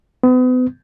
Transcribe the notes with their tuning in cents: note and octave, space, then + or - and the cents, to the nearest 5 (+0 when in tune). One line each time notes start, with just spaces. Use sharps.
B3 +40